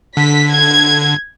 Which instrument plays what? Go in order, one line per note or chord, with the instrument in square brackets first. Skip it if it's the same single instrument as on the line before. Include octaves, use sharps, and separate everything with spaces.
[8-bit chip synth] D3 [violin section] B6
[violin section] G#6